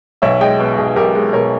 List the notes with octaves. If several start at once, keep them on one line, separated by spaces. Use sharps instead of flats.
B1 C#5 E5
G#3 D#5 G5
B2
B1 G#4
B1 G4 A#4
G#3
B2 A#4 C#5